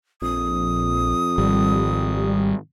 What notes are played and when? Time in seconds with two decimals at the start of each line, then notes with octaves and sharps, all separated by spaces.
0.22 A#1 F2 D#6
1.38 G#1 G3